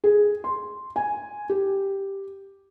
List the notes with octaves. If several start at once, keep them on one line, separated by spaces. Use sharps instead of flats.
G#4
C6
G#5
G4